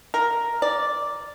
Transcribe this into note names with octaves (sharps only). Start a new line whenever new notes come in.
A#4
D5